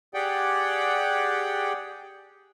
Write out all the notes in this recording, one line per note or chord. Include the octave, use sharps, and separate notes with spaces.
G4 G#4 D5 F#5 G5